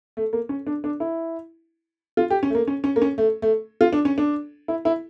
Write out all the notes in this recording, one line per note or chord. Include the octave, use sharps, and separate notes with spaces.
A3
A#3
C#4
D4
D4
E4
F4
G4
C#4
A3
A#3
C#4
C#4
A#3
C#4
A3
A3
F4
D4
C#4
D4
E4
E4